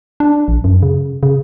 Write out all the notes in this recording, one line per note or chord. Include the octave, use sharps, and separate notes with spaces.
D4
A#1
F#2
C#3
C#3